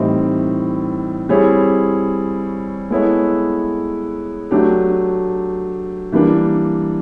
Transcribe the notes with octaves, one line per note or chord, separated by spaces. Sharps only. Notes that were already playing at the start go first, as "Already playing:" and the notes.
Already playing: A2 E3 G3 C4 D#4
G3 C4 E4 G#4 C#5
G#3 B3 E4 A4 C#5
F#3 A3 D4 G4
E3 G3 A#3 D4